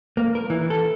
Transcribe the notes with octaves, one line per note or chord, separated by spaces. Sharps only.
A#3
A#4
E3
A4